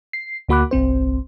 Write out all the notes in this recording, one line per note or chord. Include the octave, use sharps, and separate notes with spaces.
C7
D2 A#3 F#4 B5 D6 F#6
G1 C2 C4 C5